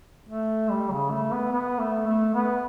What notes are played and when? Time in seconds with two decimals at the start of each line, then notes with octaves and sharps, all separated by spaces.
0.29 A3
0.70 G3
0.91 C#3
1.11 A3
1.32 B3
1.52 B3
1.79 A3
2.07 A3
2.34 B3